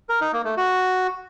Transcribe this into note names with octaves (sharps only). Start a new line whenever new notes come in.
A#4
D#4
A#3
A3
F#4